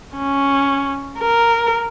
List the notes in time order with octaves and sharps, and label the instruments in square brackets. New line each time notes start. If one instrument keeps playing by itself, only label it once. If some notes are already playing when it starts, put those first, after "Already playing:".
[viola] C#4
A#4